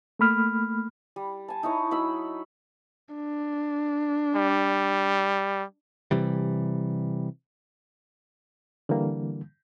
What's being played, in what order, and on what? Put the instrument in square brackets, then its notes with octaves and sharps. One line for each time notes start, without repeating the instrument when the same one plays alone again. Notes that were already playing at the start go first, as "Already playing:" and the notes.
[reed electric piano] A3 A#3 B5 F6
[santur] G3
G#5 A5
D#4 E4 C#5
F#3 D#4 B5 E6
[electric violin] D4
[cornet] G3
[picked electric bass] C3 E3 G3
[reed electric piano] D3 E3 G3 A#3